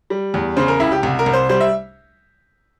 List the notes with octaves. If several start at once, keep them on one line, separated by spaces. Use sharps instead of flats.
G3
E2
C#3 C5
A#4
C#2 E4
G4
C2
A#4
C2
C5
G3 C5
E5